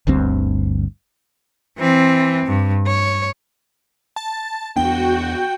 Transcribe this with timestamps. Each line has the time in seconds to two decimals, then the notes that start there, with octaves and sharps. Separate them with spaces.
0.07 G1 D2 G2 C4
1.78 E3 C4
2.46 G2
2.87 C#5
4.16 A5
4.76 E2 B3 D4 F#4 G5